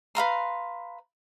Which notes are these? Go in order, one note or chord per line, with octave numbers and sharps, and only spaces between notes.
B4 F5 A#5 C6